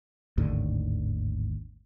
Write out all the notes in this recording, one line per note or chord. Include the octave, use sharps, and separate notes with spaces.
G#1 D#2 A2 D3